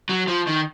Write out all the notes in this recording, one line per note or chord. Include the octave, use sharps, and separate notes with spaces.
F#3
F3
D#3